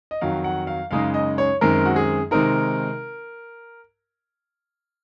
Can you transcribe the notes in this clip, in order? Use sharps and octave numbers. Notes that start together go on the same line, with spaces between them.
D#5
F2 D#3 F#3 F5
F#5
F5
F#2 C#3 G#3 D#4 F5
D#5
C#5
F#2 D#3 G#3 C4 A#4
F#4
G#4
C3 D#3 G#3 C4 D#4 A#4